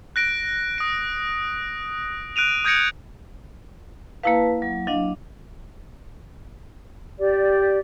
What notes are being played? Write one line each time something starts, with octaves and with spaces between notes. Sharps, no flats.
F#6 A#6 D7
D#6 D7
F#6 D7 D#7 F7
D#6 G6 G#6 A#6 C#7 D7
A#3 E4 B4 F5 A5
F#3
F#3 D4 D#5 F5
G4 D5